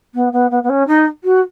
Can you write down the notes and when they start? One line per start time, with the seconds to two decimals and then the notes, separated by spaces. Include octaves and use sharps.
0.14 B3
0.32 B3
0.50 B3
0.63 B3
0.69 C#4
0.87 D#4
1.24 F#4